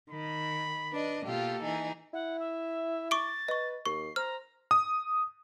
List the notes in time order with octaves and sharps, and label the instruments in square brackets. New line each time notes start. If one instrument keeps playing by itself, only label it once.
[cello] D#3 [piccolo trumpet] B5
[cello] D4 [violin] B4 D#5
[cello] B2 A#3 [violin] F4 G4 [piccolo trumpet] A4
[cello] E3 [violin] D#4 G#4
[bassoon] E4 [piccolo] F#5
[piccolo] E5
[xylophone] C#6 D6 D7 [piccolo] A6
[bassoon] B4 [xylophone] D#5 C#6
[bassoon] D#2 [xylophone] C#6 [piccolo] C7
[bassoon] C5 [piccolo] A#5 [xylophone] F6
[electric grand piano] D#6